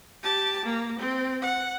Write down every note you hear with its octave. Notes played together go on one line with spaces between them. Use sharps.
G4 A5
A#3
C4
F#5